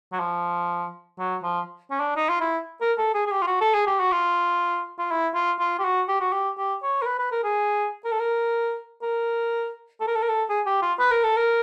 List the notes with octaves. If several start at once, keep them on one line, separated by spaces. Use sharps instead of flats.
F#3
F3
F#3
F3
C#4
D4
D#4
F4
E4
A#4
A4
G#4
G#4
G4
F4
F#4
A4
G#4
G4
F#4
F4
F4
E4
F4
F4
G4
F#4
G4
F#4
G4
G4
C#5
A#4
B4
B4
A#4
G#4
A#4
A4
A#4
A#4
A4
A#4
A4
A#4
A4
G#4
G4
F4
B4
A#4
A4
A#4